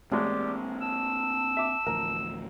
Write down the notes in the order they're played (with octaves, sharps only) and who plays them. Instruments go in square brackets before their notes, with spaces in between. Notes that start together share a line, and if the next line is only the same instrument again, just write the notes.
[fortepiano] A1 G#3 F#6 [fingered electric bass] A#3 C4 [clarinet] G4 [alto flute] D5
[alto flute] A5 [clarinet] E6
[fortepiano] E5 D6
[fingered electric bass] A1 D2 F3 [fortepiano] A#4